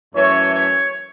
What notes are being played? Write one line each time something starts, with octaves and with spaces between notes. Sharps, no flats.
F#2 E3 A3 C#5
C#5